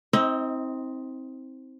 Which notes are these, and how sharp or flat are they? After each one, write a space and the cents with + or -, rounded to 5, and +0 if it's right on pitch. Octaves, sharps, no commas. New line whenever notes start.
C4 +5 D#4 +45 D#5 +15